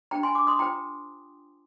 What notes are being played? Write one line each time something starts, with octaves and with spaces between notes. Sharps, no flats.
D4 G4 C5 G5 A#5
G#5 C6
A#5 D6
C6 D#6
F4 C5 G5 A#5